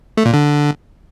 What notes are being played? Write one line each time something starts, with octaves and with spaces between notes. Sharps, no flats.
A3
A#2
D3